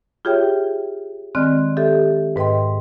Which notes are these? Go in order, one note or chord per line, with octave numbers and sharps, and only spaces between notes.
F4 G4 G#4 C#5 E5 G5
D#3 G#3 C4 D5 F6 F#6
G4 A4 E5
G#2 B4 D#5 G5 C6